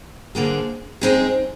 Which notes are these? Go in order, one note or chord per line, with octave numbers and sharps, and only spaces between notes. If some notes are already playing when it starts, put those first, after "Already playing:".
D3 F3 A#3 D4 G#4
G#3 C4 D#4 G#4